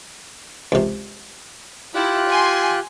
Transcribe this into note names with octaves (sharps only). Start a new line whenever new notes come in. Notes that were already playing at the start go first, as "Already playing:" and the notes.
C#2 C3
E4 F4 G4 F#6
G#5 C6